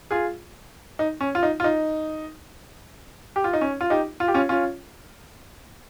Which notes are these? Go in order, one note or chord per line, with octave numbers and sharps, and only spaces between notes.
F4 G#4
D#4
C#4
F4
D#4
F4
D#4
G4
F4
D#4
C#4
F4
D#4 G4
F4
G4
C#4 F4
C#4 F4